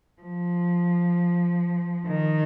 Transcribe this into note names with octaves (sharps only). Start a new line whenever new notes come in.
F3
D#3